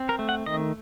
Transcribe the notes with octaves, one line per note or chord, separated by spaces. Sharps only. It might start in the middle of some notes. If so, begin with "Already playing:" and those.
Already playing: C4
A#4
A3
F#5
D#3 D#5